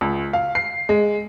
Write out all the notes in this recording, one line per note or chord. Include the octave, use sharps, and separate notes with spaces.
C#2
F5
C7
G#3